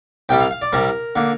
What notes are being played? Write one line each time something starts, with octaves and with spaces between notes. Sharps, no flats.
C2 C3 G3 G5
F5
F5
D5
C2 C3 G3 A#4
D3 A#3